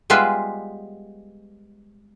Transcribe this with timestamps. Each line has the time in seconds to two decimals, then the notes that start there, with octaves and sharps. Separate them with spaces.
0.10 G3 G#3 B3 F4 B4 E5